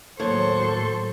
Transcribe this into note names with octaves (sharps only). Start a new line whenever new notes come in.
D#2 A2 F#3 A4 C5 C#5 C#6